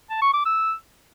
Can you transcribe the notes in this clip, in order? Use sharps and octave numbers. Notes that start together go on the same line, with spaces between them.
A5
C#6
D6
E6